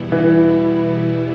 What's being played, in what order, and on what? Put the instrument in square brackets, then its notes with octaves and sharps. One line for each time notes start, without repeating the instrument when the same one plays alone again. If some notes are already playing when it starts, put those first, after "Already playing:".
Already playing: [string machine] E2 B2 G3 B3 E4
[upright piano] E3